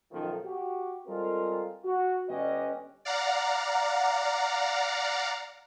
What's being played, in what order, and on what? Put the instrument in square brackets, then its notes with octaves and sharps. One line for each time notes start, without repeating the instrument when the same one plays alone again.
[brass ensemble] B1 F#2 D#3 F3 A4
F#4 G4
G3 G#3 C4 F4 A4 A#4
F#4
G1 C#4 G4 B4 D5 D#5
[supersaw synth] D5 F5 F#5 A#5